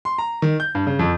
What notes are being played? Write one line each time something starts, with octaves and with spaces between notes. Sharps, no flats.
C6
A#5
D#3
G6
G2
C#3
F2